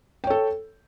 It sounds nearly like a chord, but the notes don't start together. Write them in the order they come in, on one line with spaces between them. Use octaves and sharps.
G5 C#5 A4